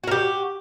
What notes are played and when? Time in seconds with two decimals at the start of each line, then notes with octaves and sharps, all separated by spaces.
0.04 F#4
0.07 A#4
0.11 G4